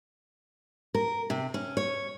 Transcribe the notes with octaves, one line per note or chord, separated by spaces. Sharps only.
A#4
C3
C#4
C#5